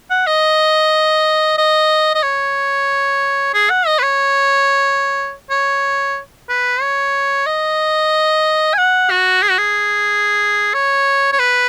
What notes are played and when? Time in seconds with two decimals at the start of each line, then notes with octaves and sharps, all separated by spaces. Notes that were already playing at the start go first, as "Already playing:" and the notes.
0.10 F#5
0.27 D#5
1.58 D#5
2.15 D#5
2.23 C#5
3.54 G#4
3.70 F#5
3.87 D#5
3.99 B4
4.03 C#5
5.50 C#5
6.49 B4
6.81 C#5
7.46 D#5
8.74 G#5
8.78 F#5
9.10 F#4
9.42 G#4
9.50 F#4
9.58 G#4
10.74 C#5
11.32 C#5
11.39 B4